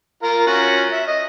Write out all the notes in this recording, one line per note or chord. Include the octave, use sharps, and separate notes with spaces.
F4 A#4 F5
C#4 F4 F#4
E5
D#5